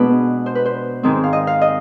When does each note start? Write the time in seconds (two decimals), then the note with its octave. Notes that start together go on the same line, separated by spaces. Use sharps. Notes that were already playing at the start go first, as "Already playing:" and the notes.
Already playing: B2 G#3 B3 D4 B4
0.46 C5
0.55 B4
0.65 C5
1.03 G#2 D#3 G#3 C4
1.24 F5
1.33 D#5
1.47 F5
1.61 D#5